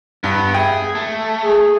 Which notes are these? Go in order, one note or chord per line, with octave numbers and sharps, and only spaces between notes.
G2 B3 B5
G#4 E5 G5
A3
G#4